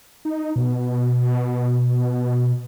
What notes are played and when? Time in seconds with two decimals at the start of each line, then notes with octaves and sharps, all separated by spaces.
0.25 D#4
0.56 B2